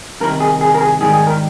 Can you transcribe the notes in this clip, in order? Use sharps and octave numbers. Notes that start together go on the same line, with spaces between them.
C2 C3 D#3 A#4
G#4
G#4
A#4
G#4
G#2 D#3 G3 G#4
G#4
A#4